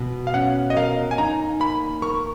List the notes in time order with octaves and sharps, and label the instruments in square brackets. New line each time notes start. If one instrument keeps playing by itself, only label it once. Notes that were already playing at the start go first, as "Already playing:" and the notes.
Already playing: [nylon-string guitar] B2
[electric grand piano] F5
[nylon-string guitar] C#4 [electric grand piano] F#5
[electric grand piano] D#5
[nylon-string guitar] A#4 [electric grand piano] F5
[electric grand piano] G#5
[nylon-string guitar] D#4 [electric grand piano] A#5
[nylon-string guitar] A#3 [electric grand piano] B5
[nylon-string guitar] A#4 [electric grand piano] C#6